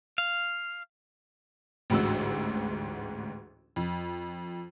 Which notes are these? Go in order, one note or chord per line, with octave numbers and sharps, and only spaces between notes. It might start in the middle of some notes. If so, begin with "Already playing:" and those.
F5
A1 D2 G#2 F#4 E6
F2